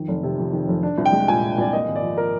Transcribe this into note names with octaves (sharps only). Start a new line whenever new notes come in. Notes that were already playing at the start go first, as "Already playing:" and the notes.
Already playing: F2 D#3
F1
C3
F2
D#3
F1
D4
C2
G5
G#3
A#2 G#5
D4
C2 D5
A#3 D#5
G#1
D5
F3
A#4